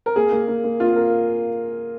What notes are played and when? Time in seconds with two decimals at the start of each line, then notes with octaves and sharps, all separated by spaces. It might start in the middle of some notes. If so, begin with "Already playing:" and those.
0.06 A#4
0.16 A#3 G#4
0.32 A#3
0.48 A#3
0.64 A#3
0.80 A#3 F4
0.96 A#4